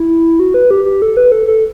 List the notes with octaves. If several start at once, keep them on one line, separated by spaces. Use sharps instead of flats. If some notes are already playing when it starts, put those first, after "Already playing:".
Already playing: E4
F#4
B4
G4
G4
A4
B4
A4
A4